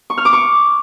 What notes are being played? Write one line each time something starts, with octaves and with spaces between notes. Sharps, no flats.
C#6
F6
D6
C#6